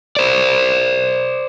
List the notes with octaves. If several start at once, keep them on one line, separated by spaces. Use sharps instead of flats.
C5 D5